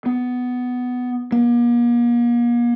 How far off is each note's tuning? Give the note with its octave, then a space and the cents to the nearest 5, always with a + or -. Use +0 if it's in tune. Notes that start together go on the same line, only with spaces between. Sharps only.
B3 +10
A#3 +40